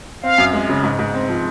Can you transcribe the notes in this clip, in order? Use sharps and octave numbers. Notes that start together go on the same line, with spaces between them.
C4 F5
F#2
G#3
C#3
G#2
G#2
C4
F3